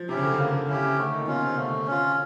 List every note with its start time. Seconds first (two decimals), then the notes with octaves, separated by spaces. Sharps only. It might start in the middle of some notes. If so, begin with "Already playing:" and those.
Already playing: F3
0.09 C3 C#4 E4 G4
0.17 C#3
0.23 D3
0.33 C#3
0.38 D3 A#3
0.47 C#3
0.53 D3
0.67 C#3 C#4 E4 G4
0.83 C#3
0.97 D3 A3
1.13 D#3
1.21 A#2
1.27 B2 C#4 F4
1.43 C3
1.57 D3 A3
1.87 C#4 F4